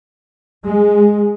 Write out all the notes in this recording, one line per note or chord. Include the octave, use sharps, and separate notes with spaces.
G#3